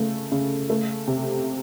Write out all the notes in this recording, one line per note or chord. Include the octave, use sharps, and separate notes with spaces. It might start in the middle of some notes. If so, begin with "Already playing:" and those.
Already playing: C#3 A3
C#3
A3
C3